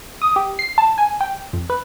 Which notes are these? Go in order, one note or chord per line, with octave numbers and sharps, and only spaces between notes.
D#6
G4
C7
A5
G#5
G5
F2
B4